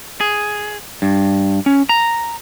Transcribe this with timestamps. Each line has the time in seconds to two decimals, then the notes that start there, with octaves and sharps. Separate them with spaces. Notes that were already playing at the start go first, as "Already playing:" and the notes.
0.20 G#4
1.02 G2
1.66 C#4
1.89 A#5